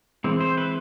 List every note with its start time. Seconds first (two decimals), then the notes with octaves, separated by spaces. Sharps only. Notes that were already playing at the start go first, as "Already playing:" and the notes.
0.24 E3 G#3 C4
0.41 C5
0.57 B4